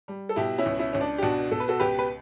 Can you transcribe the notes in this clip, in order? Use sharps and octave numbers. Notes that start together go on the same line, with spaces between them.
G3
A4
B2 E4 G4
C#4 E4
C#2
C#4 E4
C#2 C#4
D4
G4
B2 D4 F#4
B2 A4
B4
F#4 A4
C#2 G4 B4
B4